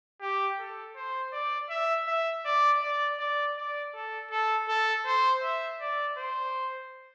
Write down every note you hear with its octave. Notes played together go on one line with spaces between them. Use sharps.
G4
A4
C5
D5
E5
E5
D5
D5
D5
D5
A4
A4
A4
C5
E5
D5
C5